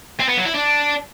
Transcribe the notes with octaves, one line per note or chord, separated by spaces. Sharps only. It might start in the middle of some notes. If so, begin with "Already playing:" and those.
C4
B3
F#3
E4
D4